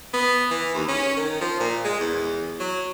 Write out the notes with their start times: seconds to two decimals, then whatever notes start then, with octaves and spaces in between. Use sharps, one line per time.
0.14 B3
0.51 E3
0.75 D#2
0.88 C#4
1.17 D#3
1.41 F3
1.60 A#2
1.84 G#3
2.00 E2
2.60 F#3